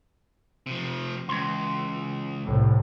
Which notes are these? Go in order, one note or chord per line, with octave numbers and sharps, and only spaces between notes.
C3 F3
C#2 E3 C6
C2 A2